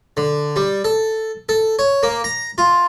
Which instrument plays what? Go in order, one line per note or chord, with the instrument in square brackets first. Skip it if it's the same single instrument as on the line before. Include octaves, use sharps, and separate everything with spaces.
[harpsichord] D3
G3
A4
A4
C#5
A#3
A#5
F4